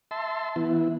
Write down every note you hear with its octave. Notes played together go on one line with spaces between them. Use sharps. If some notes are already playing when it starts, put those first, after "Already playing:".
E5 A5 C6
E3 B3 E4